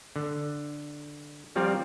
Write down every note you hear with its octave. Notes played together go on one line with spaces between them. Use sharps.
D3
F3 G3 C4 F4 A#4 D5